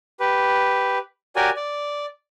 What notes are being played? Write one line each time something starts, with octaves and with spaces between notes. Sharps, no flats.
G4 B4
F#4 G4 A#4 C#5 D5 G#5
D5